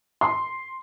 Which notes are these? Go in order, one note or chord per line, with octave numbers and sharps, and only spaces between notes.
C6